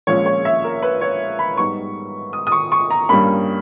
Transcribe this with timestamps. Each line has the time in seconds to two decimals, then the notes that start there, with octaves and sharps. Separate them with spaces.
0.07 A#1 A#2 G#3 C#4 C#5
0.26 C#5
0.45 E5
0.64 A#4
0.82 B4
1.01 C#5
1.39 B5
1.57 G#2 G3 B3 D#4 C#6
2.33 D#6
2.47 D#6
2.52 C#6
2.72 C#6
2.90 A#5
3.09 G2 G3 A#3 C#4 B5